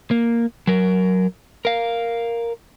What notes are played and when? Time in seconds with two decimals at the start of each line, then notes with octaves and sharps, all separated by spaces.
0.11 A#3
0.67 F#3 A#4
1.65 A#4 F5